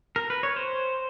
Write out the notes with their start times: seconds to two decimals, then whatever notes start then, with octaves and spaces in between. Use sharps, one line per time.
0.16 A#4
0.30 B4
0.43 C#5
0.56 C5